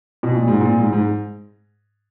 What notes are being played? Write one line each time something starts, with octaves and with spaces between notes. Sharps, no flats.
B2
A#2
G#2
A#2
G#2
G#2